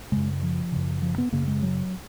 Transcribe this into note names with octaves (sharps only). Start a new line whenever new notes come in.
F#2 C#3 G#3
F3
F#2 C#3
F3
B3
F#2 C#3 A#3
G#3
F#3